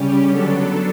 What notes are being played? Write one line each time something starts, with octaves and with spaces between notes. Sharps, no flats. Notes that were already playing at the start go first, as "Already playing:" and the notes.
Already playing: C#3 G3 C#4 G4
D3 F#3 B3 D4 A4